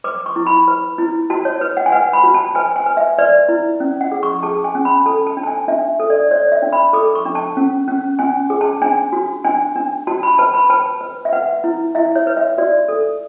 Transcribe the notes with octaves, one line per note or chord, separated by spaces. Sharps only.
B4 D6
C#6
E4
B5
B4
E4
F#4 A5
C#5
B4
F#5
G#5
B4 F#5
B5
F#4
A5
B4 G#5
G#5
B4
E5
B4 D5
E4
C#4
F#5
G#4
C#6
G#4 A5
G#5
C#4
B5
A4 A5
A5
D4
A5
G#5
D4 E5
A4
D5
C#5 D5
E5
D4
B5
A4 D6
C#6
D4
A5
C#4
C#4
C#4 G#5
G#4
A5
D4 G#5
F#4
D4 G#5
D4
F#4 A5
B5
B4 A5
B5
B4 A5
B4
E5
B4 F#5
E4
E4 E5
C#5
B4
E5
F#4 D5
A4